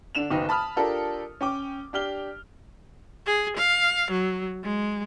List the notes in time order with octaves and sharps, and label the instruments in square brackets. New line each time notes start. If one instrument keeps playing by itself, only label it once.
[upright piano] D3 D4 E7 F7
F#1 B1 D#3 D#4 B4 G5
A5 B5 D#6 F6
D4 F4 G4 A4 A#4
C#4 G5 D6
D4 G4 F6 G7
[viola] G#4
F5
F#3
G#3